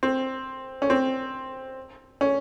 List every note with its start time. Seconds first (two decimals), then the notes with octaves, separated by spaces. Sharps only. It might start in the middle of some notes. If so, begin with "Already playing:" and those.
0.03 C4
0.82 C#4
0.90 C4
2.21 C#4